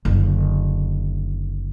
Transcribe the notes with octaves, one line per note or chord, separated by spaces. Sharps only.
F#1 D3